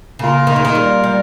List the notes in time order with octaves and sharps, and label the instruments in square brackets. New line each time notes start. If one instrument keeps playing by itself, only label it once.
[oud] C#3 [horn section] A#3 F4 A#4
[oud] D#3
C#3
D#3
G3
G3